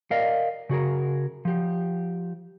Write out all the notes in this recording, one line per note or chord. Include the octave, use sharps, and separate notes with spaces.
A#4 D5 D#5 F5
C#3 F#4 G#4 A#4
F3 G4